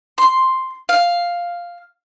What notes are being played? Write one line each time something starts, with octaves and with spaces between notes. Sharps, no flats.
C6
F5